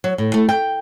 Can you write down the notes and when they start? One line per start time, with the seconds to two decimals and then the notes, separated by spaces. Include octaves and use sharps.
0.04 F#3
0.18 A2
0.34 A3
0.49 G5